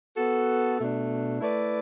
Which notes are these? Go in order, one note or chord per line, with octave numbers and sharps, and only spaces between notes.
B3 F#4 A4
B2 A3 D4
A3 E4 B4 D5